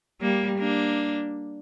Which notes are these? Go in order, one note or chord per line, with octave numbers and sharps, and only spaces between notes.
G3 A#3
A#3 D4